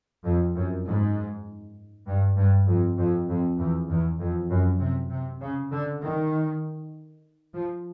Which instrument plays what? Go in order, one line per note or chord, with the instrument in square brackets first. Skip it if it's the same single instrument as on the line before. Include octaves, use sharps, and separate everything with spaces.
[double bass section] F2
F#2
G#2
G2
G2
F2
F2
F2
E2
E2
F2
F#2
C3
C3
C#3
D3
D#3
F3